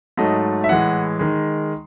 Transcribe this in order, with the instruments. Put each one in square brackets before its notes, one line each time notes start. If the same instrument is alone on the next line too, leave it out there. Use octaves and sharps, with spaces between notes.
[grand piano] G#2 F#3 A3 D#5
E5
A2 E3 G#3 F#5
D#3 G#3